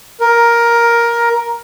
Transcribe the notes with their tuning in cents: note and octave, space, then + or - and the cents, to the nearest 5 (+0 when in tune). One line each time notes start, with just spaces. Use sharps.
A#4 +10